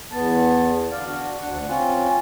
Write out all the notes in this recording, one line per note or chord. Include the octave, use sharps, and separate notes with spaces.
E2 B3 A5
D3 D5 F5
D4 F#4
D2 D4 F#5
C4 C#4 F4